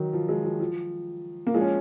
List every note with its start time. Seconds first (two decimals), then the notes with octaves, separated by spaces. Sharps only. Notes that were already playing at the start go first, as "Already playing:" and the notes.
Already playing: D#3 F#3
0.13 F3
0.29 F3 G#3
0.45 F3
0.60 F3
1.47 A#3
1.54 F3 G#3
1.61 C#4